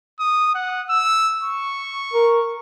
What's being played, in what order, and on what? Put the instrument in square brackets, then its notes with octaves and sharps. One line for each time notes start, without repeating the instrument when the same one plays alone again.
[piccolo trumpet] D#6
F#5
E6
C#6
[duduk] A#4